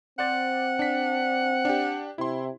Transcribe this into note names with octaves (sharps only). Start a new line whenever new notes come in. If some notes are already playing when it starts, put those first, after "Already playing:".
C4 C5 D5 F#5 A6
D4 B6
D4 G4
C3 E4 C6